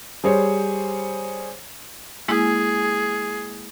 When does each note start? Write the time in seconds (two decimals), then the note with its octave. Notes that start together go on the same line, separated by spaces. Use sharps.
0.24 G3 G#4 C5 C#5
2.29 G#3 A#3 E4 G#4